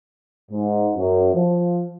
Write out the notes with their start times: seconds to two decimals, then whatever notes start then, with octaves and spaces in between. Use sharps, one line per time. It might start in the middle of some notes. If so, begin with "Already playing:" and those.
0.52 G#2
0.96 F#2
1.34 F3